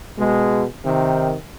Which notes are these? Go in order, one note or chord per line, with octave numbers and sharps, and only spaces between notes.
B2 G#3
C3 D#3